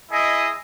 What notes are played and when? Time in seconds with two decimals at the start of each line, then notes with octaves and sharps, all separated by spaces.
0.12 E4 G#4 D#5